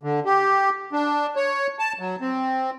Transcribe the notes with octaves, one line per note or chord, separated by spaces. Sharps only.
D3
G4
D4
C#5
A5
F#3
C4